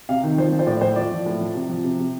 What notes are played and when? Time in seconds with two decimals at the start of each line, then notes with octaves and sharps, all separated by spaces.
0.09 C3 F5
0.23 D#3
0.37 F3 C5
0.52 F3
0.59 C5
0.66 A2 D5
0.81 A2 C5
0.96 F3 D5
1.12 F3
1.26 A2
1.41 F3
1.55 C3
1.70 F3
1.84 C3
1.99 C3